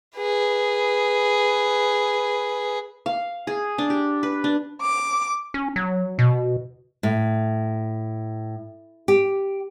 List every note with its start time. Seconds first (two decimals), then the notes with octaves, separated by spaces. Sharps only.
0.17 G#4 B4
3.06 F5
3.47 G#4
3.78 D4
3.90 G4
4.23 B4
4.44 D4
4.82 D6
5.54 C#4
5.76 F#3
6.19 B2
7.03 A2
9.08 G4